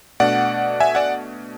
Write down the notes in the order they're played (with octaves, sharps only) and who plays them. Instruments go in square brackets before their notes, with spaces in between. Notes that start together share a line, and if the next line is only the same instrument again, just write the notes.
[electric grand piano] B2 A3 D4 D5 F#5
E5 G#5
D5 F#5